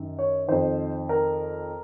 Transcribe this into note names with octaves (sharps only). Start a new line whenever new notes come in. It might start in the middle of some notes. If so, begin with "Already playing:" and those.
Already playing: F#2 D#3
C#5
F2 D#3 C5
A#4